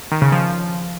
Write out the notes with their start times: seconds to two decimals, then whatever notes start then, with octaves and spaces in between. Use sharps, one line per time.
0.12 D#3
0.22 C#3
0.32 F3